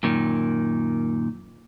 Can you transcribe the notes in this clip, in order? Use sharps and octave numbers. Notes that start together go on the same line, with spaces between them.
F#2 A#2 D#3